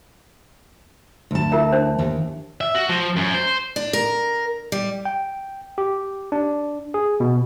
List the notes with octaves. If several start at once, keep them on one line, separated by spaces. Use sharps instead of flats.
D2 A5
E4 A#4 E5
D4 C5
D#2
E5
F#4
F3
F#2
C5
D4
A#4
G3
G5
G4
D4
G#4
B2